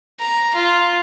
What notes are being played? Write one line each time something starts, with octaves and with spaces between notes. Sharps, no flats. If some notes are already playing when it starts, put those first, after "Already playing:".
A#5
F4